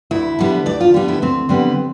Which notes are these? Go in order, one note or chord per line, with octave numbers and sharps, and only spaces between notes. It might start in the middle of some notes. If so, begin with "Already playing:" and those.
D2 E4
D3 G3 B3
D2 D5
F4
D3 G3 B3 G4
E4
D2 C4
D3 G3 B3